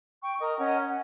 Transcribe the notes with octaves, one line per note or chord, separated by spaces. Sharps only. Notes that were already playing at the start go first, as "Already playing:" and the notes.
G5 C#6
A#4 D#5 D#6
C#4 D#5 F#5
F#5